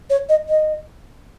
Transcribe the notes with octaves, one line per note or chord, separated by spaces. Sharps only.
C#5
D#5
D#5